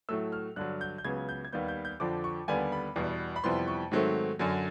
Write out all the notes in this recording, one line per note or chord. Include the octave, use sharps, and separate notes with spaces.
A2 F#3 A3 E6
F6
G2 D3 F#3 F#6
G6
G6
C#2 C#3 F#3 B3 G#6
G6
G#6
D#2 D#3 G3 B3 G6
G6
G6
F2 D3 F3 D6
C#6
D#2 D3 G3 B3 G#5
B5
E2 B2 G3
B5
F2 C3 E3 G3 B3 C6
C#6
G#2 D#3 F#3 A3 C4
F#2 D3 F#3